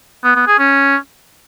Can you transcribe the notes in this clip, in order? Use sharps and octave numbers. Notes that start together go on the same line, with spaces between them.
B3
B3
G#4
C#4